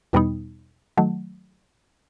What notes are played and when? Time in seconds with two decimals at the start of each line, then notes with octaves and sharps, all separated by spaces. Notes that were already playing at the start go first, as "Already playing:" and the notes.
0.13 E2 B2 G3 B3 D#4
0.97 D#3 F#3 A3